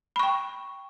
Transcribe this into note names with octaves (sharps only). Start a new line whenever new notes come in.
G5 B5 C#6